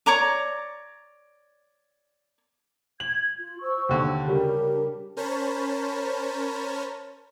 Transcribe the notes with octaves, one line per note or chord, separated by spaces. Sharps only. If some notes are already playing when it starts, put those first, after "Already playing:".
C#5 D5 A#5 D6
G#6 F#7
F4
C5 C#6 E6
D#2 D3
C#3 G3 D4 G4 A#4
C#4 A#4 C5 C#5 A5 B5